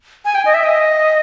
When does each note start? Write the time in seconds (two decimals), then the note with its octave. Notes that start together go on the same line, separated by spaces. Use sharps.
0.25 G#5
0.35 G5
0.45 D#5
0.54 E5
0.64 D#5